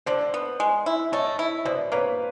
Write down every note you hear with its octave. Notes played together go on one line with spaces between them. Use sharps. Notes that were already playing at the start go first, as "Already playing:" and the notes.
D3 C5 D5
B3
G#3
E4
A3 C#5 D#5
E4
B2 C5 D5
A#3 B4 C#5